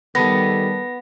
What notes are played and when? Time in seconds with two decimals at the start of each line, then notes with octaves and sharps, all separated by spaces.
0.15 D#3 G3 B3 A4 A#6